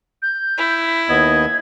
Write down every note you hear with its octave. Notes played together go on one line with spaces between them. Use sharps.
G6
E4
D#2 B3 D#5 G#6